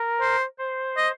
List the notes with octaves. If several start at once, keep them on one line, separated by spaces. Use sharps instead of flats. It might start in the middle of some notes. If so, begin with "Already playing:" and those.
Already playing: A#4
C5
C5
D#5